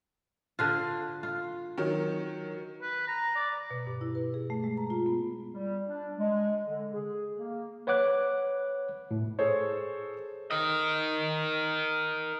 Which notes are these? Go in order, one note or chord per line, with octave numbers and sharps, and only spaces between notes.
D3 D4 F4
F4
D#3 F#3
B4
A#5
D5
B2
G2
E4
B4
G#4
A3
G#3
A#5
F4
B3
G3
D4
G#3
D3
G#4
A#3
B4 C#5 F#5 D6 F#6
A2
G#4 A4 C5 C#5
A#4 D#5